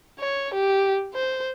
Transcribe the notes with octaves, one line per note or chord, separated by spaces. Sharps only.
C#5
G4
C5